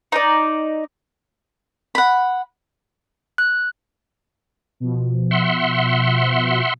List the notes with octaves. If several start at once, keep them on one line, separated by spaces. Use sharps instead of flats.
D#4 D5
F#5 B5
F#6
B2 F3
E5 F#5 C6